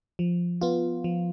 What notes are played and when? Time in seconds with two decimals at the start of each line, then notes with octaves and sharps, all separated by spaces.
0.19 F3
0.61 B3 F4
1.04 F3